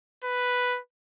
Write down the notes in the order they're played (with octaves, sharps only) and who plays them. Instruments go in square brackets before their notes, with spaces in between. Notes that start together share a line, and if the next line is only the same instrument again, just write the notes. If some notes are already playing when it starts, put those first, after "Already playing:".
[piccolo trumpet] B4